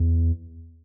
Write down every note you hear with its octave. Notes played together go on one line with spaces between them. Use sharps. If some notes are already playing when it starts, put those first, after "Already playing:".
Already playing: E2